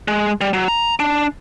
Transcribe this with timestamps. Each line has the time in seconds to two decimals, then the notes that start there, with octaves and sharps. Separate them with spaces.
0.08 G#3
0.41 G3
0.53 F#3
0.68 A#5
1.00 D4